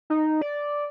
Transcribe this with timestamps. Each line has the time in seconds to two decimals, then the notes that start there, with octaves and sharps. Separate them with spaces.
0.10 D#4
0.41 D5